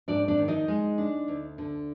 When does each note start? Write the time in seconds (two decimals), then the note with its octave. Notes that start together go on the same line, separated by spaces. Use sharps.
0.08 G#2 D4 D5
0.28 D4 D5
0.38 D#3
0.48 D#4 D#5
0.68 G#3
0.98 D4
1.28 D2
1.58 D3